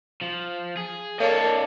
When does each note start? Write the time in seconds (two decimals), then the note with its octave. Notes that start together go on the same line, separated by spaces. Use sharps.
0.21 F3
0.77 G#4
1.19 A#3 D4 A4 C#5 D#5